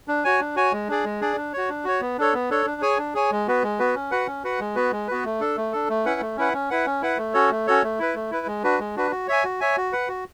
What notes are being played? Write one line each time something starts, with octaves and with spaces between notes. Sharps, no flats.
D4
F#4 C#5 G#5
D4
F#4 C#5 G#5
G#3
D4 G#4 D5
G#3
D4 G#4 D5
D4
F#4 C#5
D4
F#4 C#5
B3
D4 A4 C#5
B3
D4 A4 C#5
D4
G#4 C#5 G#5
D4
G#4 C#5 G#5
G#3
B3 F#4 B4
G#3
B3 F#4 B4
C#4
F#4 B4 F#5
C#4
F#4 B4 F#5
G#3
B3 F#4 B4
G#3
B3 F#4 B4
A3
D4 A4
A3
D4 A4
A3
C#4 E4 B4 F#5
A3
C#4 E4 B4 F#5
C#4
E4 B4 F#5
C#4
E4 B4 F#5
A3
C#4 F#4 A4 C#5
A3
C#4 F#4 A4 C#5
A3
E4 B4
A3
E4 B4
G#3
D4 F#4 B4
G#3
D4 F#4 B4
F#4
C#5 E5 G#5
F#4
C#5 E5 G#5
F#4
B4 F#5
F#4